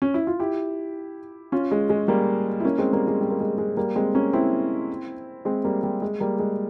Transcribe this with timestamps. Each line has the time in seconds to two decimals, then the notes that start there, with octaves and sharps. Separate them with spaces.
0.02 C#4
0.14 E4
0.27 F4
0.40 E4 G4
1.52 C#4 F4
1.71 G#3
1.90 G#3
2.08 G3 A#3
2.60 E4
2.65 A#3 C#4
2.78 G#3 C4
2.93 G3 A#3
3.07 G#3
3.21 G3
3.30 A#3
3.40 G#3
3.58 G#3
3.77 G3 A#3
3.95 G#3 C4
4.15 A#3 C#4
4.33 C4 E4
5.45 G#3 C4
5.64 G3 A#3
5.83 G3
6.02 G#3
6.20 G3 A#3
6.39 G#3